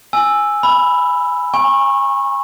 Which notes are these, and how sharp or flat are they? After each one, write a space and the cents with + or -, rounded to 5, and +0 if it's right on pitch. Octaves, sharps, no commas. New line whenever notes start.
G#5 +0 E6 +0
B5 +0 E6 +35
G#5 -30 C#6 -25